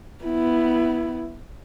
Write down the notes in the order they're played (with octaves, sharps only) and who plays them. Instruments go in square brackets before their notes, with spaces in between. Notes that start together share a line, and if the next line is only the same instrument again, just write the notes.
[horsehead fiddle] B3 E4